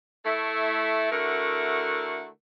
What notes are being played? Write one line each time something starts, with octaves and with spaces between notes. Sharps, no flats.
A3 E4
D3 A3 E4 F#4 A#4